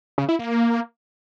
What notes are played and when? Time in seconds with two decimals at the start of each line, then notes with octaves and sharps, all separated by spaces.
0.18 C#3
0.29 E4
0.39 A#3